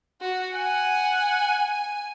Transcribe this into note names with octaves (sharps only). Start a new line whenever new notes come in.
F#4
F#5 G#5